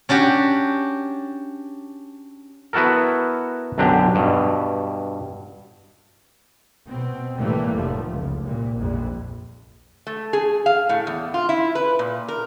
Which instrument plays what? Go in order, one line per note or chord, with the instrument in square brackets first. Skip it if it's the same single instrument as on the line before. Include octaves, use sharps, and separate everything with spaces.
[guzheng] C#4 D4 F#4 G4
[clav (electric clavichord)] B3 E4 F#4 A4 A#4
B1 F#2 D3 D4 G4 A#5
G2 B2
[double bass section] B2 C4
A2 C3 E3 G3 A3 A#3
F1 F3 A3
C#2
C2 A#2
A#1 F2
[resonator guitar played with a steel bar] A3
G#4
F5
A2
E2
F4
E4
B4
A#2
A#4